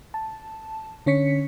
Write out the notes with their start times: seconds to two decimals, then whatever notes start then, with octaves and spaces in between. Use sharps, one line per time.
0.14 A5
1.06 D3 C#4 C#5 B6 C#7